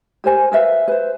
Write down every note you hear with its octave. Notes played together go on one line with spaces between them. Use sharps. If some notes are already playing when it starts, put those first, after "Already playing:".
G4 A#4 C5 G#5
A#4 B4 E5 F5
B4 C5